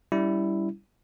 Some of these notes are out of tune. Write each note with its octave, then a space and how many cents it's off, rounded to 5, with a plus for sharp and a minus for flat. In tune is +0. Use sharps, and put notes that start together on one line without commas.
G3 +0 C#4 +40 E4 +0